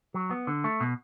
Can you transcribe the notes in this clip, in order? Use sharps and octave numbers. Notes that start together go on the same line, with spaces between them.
F#3
B3
D3
A3
B2